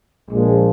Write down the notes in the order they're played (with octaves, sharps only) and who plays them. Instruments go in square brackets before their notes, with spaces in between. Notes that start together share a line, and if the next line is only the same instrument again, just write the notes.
[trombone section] A#1 A#2 F3 G#3